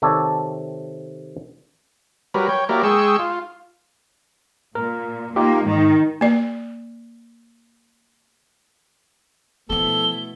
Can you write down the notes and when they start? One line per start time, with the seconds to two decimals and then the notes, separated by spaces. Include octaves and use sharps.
0.02 C3 D#3 A4 C#5 D5 A5
2.34 F#3 G3 A#4 B4
2.49 C#5 G5
2.69 F#3 A#3 E4 G4 A#4 D5
2.83 G#3 G#4 G5 C#6 E6
3.19 F4
4.75 A#2 A#4
5.36 A#3 D#4 F4 G4
5.66 G#2 D#3
6.21 A#3 D5
9.70 B2 F3 A3 B3 E4 A4 G7